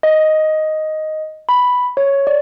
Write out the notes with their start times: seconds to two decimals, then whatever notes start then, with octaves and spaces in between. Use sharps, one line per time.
0.03 D#5
1.49 B5
1.97 C#5
2.27 D5